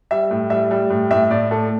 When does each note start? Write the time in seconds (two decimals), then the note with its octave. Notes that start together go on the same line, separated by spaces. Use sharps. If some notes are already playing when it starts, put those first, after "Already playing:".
0.11 G3 E5
0.31 A2
0.50 G3 E5
0.71 G3
0.90 A2
1.11 A2 E5
1.31 A2 D5
1.51 A2 A4